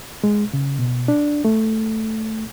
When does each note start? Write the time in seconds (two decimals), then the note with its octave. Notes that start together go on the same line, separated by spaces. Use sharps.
0.24 G#3
0.53 C#3
0.79 B2
1.08 D4
1.45 A3